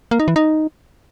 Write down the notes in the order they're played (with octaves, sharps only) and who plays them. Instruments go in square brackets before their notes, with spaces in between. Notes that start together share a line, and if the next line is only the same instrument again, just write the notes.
[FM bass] A#3
D#4
E3
D#4